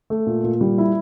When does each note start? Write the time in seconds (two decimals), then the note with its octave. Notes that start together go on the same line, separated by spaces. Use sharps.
0.10 A3
0.26 A#2
0.43 A#2
0.61 G3
0.78 E4